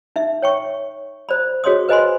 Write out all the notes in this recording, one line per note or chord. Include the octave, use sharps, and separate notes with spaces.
D#4 E5
C#5 G5 C#6
C5 D5 B5
F#4 G#4 C#5 D#5 C6 D#6
B4 C5 D#5 G#5 B5 C6